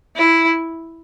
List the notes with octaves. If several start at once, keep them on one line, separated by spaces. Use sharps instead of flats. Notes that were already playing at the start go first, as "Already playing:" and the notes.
E4